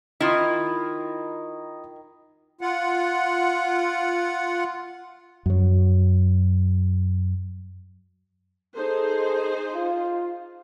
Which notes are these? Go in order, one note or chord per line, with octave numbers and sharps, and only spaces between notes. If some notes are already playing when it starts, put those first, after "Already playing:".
D#3 E4 F4 D#5 D#6
F4 F#5
F#2 F#3
D#4 G#4 A4 C5
F4